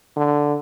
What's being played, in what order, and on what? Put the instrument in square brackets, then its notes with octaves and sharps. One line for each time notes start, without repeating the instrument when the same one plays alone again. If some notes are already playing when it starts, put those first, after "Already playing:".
[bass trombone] D3